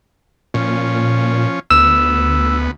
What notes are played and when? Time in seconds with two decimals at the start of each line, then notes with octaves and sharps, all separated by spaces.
0.54 A#2 F3 C#4
1.71 D2 B3 E6